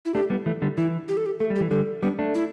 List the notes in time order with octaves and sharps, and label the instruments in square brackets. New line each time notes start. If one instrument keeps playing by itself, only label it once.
[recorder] E4
[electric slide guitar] A3 D4 [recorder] G4
[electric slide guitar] G3 B3
E3 A3
D3 G3
[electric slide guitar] E3 [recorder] E4
[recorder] G4
A4
G4
[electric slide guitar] A3 [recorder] A4
[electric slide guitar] G3
[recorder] G4
[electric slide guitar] E3
[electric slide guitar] D3 G3 [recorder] A4
[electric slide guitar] G3 B3 [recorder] D4
[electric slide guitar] A3 D4
[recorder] E4